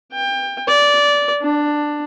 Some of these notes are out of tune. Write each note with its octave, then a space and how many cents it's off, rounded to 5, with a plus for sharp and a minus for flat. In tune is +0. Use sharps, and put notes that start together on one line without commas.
G5 +25
D5 -15
D4 +10